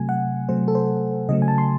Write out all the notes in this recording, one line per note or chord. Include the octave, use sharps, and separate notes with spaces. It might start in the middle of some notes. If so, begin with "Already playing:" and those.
Already playing: C3 F#3 A3 G#5
F#5
C3 F#3 A3 C5
A4
C5
C#3 F#3 A3 D#5
G#5
A5
C6